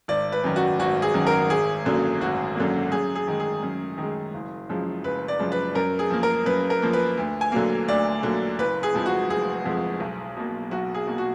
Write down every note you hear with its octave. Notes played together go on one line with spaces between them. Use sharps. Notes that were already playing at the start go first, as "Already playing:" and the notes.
G#1 D5
B4
F#2 D#3
F#4
G#1 F#4
G#4
F#2 D#3
A#4
G#1 G#4
F#2 D3 F#3 A#3
G#1 F#4
F#2 D3 F#3 A#3
F#2 G#4
G#4
D#3 G#3
G#4
F#2
D#3 G#3
F#1
F#2 F3 G#3
F#1 B4
D5
F#2 F3 G#3
B4
F#2 A#4
G#4
F3 A#3
A#4
F#2 B4
A#4
F3 A#3
B4
D2
G#5
D3 F#3 A#3
D2 D5
D3 F#3 A#3
F#1 B4
G#4
F2 F3 G#3
F#4
F#1 G#4
F2 F3 G#3
B1
B2 A#3
B1 F#4
G#4
B2 A#3
F#4